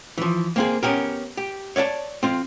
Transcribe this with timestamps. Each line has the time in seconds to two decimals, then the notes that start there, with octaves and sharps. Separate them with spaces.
0.18 E3 F3
0.56 A#3 C4 G#4
0.83 B3 C#4 G4 A#4
1.37 G4
1.76 C#5 D5 F5 A5
2.23 C4 F4